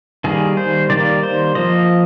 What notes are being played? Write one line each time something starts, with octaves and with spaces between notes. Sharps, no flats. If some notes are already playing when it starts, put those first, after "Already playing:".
D#3 G3 A#3 G#4
C5
D#3 G3 A#3 D5
C5
F3 A#3 D#5